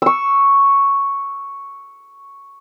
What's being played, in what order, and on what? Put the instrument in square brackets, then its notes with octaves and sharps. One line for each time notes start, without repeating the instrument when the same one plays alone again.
[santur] C#6 E6